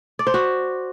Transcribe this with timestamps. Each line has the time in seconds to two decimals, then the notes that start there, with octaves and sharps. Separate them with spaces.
0.19 D5
0.27 C5
0.34 F#4